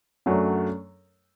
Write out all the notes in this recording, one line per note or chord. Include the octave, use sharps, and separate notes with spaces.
F#2 F#3 A3 D4